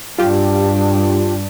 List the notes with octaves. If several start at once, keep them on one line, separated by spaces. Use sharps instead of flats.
G2 D4 F4 G4